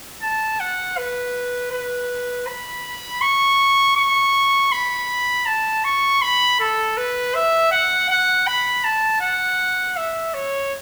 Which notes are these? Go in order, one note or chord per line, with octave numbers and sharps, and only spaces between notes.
A5
F#5
B4
B4
B5
C#6
C#6
B5
A5
C#6
B5
A4
B4
E5
F#5
F#5
B5
A5
F#5
E5
C#5